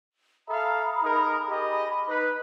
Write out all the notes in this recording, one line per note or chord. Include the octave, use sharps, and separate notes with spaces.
A4 E5 F5 A#5 B5 D#6
D#4 G#4 A#4
G4 G#4 D#5 B5
D#4 B4